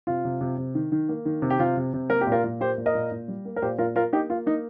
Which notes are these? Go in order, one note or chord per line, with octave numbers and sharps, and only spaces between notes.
C3 F4
C3
C3
C3
D#3
D#3
A#3
D#3
C3
G4
C3 F4
C3
C3
A#3 A#4
G4
A#2
F4 A#4
A#2
A#3 G4 C5
A#2
A#4 D#5
A#2
A#2
G3
A#3
A#4
A#2 G4 C5
A#2 F4 A#4
A#3 F4 A#4
A#3 D#4 G4
A#3 F4
A#3 D#4